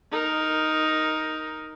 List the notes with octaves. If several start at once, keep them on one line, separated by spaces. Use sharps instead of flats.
D#4 A#4